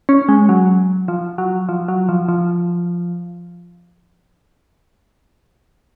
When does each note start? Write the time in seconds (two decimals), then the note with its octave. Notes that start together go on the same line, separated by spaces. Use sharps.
0.09 C#4
0.29 G#3
0.49 F#3
1.08 F3
1.38 F#3
1.69 F3
1.88 F#3
2.09 F3
2.28 F3